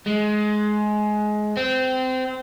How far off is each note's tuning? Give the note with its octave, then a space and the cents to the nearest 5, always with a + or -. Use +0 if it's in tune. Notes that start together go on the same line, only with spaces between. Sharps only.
G#3 +20
C4 -20